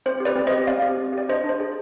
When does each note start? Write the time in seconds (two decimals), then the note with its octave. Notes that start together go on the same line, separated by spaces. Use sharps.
0.06 C4 C5
0.20 G4
0.25 B4 D5
0.36 C4
0.47 G4 C5 D#5
0.67 C4 D5 F5
0.82 G4
0.97 C4
1.13 G4 D5
1.29 D4 C5 D#5
1.44 D4
1.49 C5
1.60 G#4